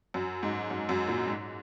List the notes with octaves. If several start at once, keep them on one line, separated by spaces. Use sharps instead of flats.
F#2
G#2
F#2
F#2
A#2
G#2